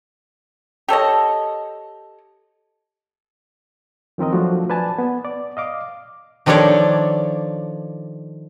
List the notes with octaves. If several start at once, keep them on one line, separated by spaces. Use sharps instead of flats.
G4 A4 C#5 D#5
D#3 F3 C4 A#4 D#5
F3 F#3 A3 D4 F#4
B4 D5 G#5 A5
B3
D5
D#5 F5 D6
D#3 F3 D4 A4 C#5 D5